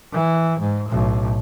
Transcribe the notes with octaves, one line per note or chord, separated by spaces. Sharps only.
E3
G#2
B1 A2